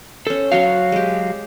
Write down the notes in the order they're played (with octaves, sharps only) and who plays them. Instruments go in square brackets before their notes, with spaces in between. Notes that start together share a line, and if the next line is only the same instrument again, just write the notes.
[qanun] C#4 C5 [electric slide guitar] A4
[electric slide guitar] F#3 F5 [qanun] F#4 C#5 C6
[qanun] G#3 G4